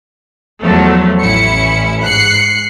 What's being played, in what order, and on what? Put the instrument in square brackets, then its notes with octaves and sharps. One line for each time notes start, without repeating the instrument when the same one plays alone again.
[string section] E2 F3 F#3 A3
A1 C#4 E4 C#7
G#2 F#6 C7 C#7